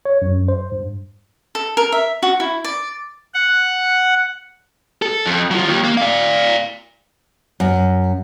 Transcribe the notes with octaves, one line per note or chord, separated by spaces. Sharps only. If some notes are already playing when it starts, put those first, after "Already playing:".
C#5
F#2
C5
G2
A4
A#4
E5
F#4
E4
D5
F#5
A4
F2
F#3 F4
D#2
A#3
D5 F5
F#2